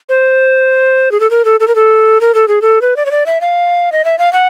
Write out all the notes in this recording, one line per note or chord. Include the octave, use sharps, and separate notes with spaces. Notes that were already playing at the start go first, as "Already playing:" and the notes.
C5
G#4
A4
A#4
A4
A4
A#4
A4
A#4
A4
G#4
A4
B4
D5
C#5
D5
E5
F5
D#5
E5
F5
F#5